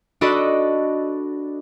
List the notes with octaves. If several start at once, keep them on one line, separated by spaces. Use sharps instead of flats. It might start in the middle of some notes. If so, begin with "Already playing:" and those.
D4 F#4 A4 D5 D#5 B5